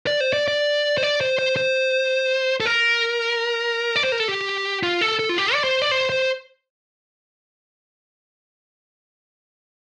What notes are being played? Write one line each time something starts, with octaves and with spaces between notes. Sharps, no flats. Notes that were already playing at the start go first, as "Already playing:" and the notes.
D5
C5
D5
D5
C5
D5
C5
C5
C5
A4
A#4
D5
C5
A#4
A4
G4
F4
A4
A4
F4
G4
D5
C5
D5
C5
C5